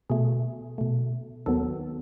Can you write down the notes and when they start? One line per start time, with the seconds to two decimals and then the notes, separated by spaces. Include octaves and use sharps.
0.10 B2 A3 G#4
0.78 B2 A3
1.46 D#2 D#3 F#3 B3 A4